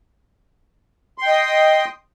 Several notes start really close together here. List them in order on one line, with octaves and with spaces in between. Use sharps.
C6 G5 D#5 D#6